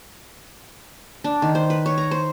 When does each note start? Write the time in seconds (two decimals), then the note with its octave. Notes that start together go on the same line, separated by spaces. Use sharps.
1.24 D4
1.42 D#3
1.55 C5
1.70 B4
1.86 C#5
1.98 A#5
2.11 C5